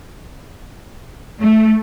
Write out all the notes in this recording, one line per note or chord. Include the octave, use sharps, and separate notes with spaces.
A3